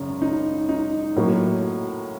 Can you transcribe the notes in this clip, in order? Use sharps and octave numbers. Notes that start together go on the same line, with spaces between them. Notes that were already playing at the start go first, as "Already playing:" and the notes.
Already playing: G#1 F#2 C#3
D#4
D#4
A2 F#3 A#3